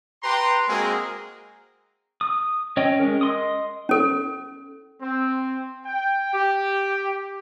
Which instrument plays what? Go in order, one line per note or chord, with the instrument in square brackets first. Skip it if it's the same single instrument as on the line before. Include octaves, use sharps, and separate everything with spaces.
[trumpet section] G4 B4 G5 A#5 C6
G#3 A#3 C4 F#4 G#4 A#4
[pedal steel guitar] D#6
C#4 C#5 D#5 G5
G#3 C#4 A#4
D#5 C6 D#6
[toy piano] C#4 A4
[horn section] C4
G5
G4